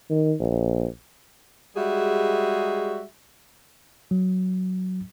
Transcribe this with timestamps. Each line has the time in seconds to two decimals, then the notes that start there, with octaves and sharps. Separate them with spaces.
0.10 D#3
0.40 A#1
1.75 G3 G#3 F#4 G#4 E5
4.11 F#3